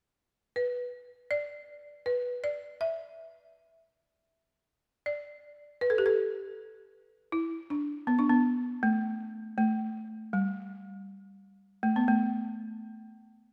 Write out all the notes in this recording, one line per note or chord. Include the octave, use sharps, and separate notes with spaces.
B4
D5
B4
D5
E5
D5
B4
A4
G4
A4
E4
D4
B3
D4
B3
A3
A3
G3
A3
B3
A3